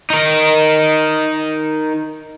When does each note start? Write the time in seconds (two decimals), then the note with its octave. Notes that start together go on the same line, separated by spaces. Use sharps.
0.10 D#4 A#4